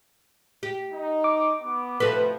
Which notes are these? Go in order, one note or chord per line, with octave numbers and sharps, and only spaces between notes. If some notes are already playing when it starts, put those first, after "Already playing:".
G4
D#4
D6
B3
A2 C3 F3 F#4 A4 B4